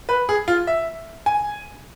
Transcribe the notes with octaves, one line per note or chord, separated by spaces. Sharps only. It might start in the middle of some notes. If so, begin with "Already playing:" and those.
B4
G#4
F4
E5
G#5